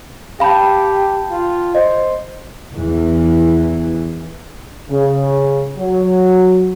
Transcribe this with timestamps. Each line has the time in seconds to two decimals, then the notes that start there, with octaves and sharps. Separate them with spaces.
0.40 G4 F5 G5 A5 B5 G6
1.31 F4
1.75 C5 D#5
2.76 E2 E3
4.90 C#3
5.78 F#3